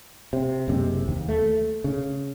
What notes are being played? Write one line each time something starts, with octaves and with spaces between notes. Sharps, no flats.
C3
F#1 C3 G#3
D#2
A3
C#3